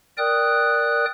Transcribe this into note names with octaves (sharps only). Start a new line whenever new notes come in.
A#4 D5 G5 D#6 F#6